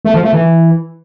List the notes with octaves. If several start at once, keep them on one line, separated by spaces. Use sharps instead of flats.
A3
F3
A3
E3